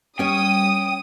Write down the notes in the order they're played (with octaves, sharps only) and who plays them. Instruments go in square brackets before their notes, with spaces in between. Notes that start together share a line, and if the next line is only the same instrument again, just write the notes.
[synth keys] G3 [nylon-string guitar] C#4 C#5 [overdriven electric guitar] G5 [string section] D#6